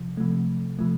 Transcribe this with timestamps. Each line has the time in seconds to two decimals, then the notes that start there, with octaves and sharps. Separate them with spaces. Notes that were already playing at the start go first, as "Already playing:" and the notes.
Already playing: C3 F3
0.17 C3 F3 A3
0.79 C3 F3 A3